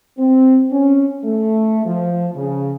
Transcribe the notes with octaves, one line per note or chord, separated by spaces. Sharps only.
C4
C#4
A3
F3
C#3